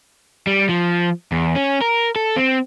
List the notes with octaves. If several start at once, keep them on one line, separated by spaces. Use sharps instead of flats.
G3
F3
E2
C#4
A#4
A4
C4